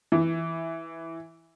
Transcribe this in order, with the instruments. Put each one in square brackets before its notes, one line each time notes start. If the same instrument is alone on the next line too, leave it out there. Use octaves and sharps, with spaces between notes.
[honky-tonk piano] E3